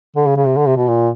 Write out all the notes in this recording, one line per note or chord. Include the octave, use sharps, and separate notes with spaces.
D3
C#3
C#3
C3
D3
C3
B2
A#2